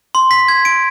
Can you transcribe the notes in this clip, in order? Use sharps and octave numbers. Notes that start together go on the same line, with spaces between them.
C6
B6
G#6
D7